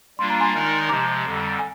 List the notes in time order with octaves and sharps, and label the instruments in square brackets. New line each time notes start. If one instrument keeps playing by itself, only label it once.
[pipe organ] G3 A#3 D4 F4 [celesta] C6
[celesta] A#5
G#5 C6
[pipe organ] D#3 G#3 D#4 A#4 D5
[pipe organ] C3 F3 G#3 [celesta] A#5 D6
[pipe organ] F2 D3 G3
[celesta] G#5